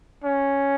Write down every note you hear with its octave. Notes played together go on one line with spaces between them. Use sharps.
C#4